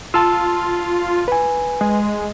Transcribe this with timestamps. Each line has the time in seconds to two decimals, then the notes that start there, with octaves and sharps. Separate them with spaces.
0.14 F4 A5 E6
1.28 B4 G#5
1.81 G#3